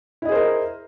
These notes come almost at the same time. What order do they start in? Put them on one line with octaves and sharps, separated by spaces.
E4 D#5 G#4 C5 A#4